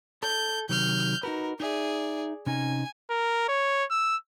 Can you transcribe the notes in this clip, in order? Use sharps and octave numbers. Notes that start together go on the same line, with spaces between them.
A4 G6
C3 D#3 F#3 F6 G6
D#4 F#4 A#4 B4
D#4 G#4 D5 E5
C3 C#4 D#4 G#5
A#4
C#5
E6